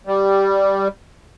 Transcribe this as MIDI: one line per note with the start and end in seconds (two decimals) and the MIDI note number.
0.07 0.88 55